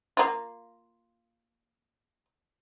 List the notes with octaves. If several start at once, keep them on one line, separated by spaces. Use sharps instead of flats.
A#3 F4